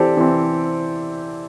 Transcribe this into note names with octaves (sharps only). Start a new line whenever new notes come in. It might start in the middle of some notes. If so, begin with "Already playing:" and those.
Already playing: E3 C4 G4 A4 C5 D5
E3 C4